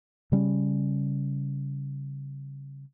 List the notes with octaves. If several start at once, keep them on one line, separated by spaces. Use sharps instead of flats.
C#3 G3 C#4